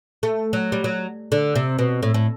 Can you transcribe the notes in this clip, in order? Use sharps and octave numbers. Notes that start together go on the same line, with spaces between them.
A3
F#3
G3
F#3
D3
C3
B2
A2
A2